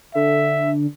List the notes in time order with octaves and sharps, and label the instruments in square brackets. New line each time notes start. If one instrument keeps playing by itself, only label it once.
[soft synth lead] D3 [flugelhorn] E5